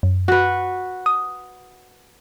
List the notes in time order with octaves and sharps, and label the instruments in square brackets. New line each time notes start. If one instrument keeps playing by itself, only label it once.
[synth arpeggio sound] F#2
[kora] F#4 B4
[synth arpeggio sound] D#6